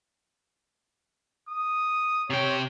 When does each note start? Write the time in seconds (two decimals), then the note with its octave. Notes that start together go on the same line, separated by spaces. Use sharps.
1.49 D#6
2.30 C3 C#5 G5